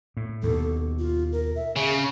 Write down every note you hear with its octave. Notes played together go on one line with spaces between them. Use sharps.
A2
D#2 B2 A4
F4
A#4
E5
C#3 G#4